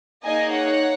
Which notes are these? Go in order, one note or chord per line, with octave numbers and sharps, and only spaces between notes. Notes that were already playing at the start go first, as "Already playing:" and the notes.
A#3 D#4 G#4 D#5 G#5
C#5 F#5